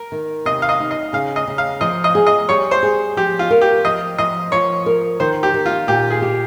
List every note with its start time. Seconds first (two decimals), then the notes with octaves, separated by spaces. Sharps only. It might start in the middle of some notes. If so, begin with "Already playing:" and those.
Already playing: A#4
0.12 D#3
0.45 C3 D#5
0.62 F5
0.69 D#5
0.80 D#4
0.91 D#5
1.13 C#3 F5
1.36 D#5
1.47 C#3
1.58 F5
1.81 F3 D#5
2.04 D#5
2.15 G#4
2.27 D#5
2.49 G3 C#5
2.71 C5
2.83 G#4
3.17 F3 G4
3.39 F4
3.50 A#4
3.62 G4
3.85 F3 D#5
4.19 F3 D#5
4.52 F3 C#5
4.86 A#4
5.20 D#3 C5
5.43 G4
5.54 D#3
5.66 F4
5.88 A#2 G4
6.10 G#4
6.22 G4